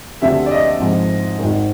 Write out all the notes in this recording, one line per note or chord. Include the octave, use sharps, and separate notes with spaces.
D2 D3 G3 C4 E5
D5
D#5
G#2 F3 G#3 C4
G#1 G#2 D#3